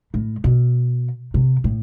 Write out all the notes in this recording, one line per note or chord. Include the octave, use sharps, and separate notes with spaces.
A2
B2
C3
A2